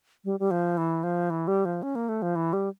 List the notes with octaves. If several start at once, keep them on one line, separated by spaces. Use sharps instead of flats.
G3
G3
F3
E3
F3
E3
G3
F3
C#4
A#3
A3
F3
E3
G3